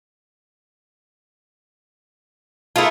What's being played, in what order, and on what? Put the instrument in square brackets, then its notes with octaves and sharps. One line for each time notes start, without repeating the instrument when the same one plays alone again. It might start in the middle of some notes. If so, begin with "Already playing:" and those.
[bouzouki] A3 E4 [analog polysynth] F4 G#4 A#4